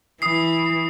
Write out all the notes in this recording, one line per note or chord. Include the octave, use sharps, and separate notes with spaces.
E3 D#6 C7